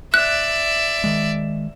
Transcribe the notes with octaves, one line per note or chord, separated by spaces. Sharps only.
D5 E5 F#6
D#3 G#3